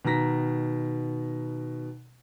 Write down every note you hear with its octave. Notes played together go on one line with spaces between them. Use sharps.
B2 D#3 A#5 A#6 B6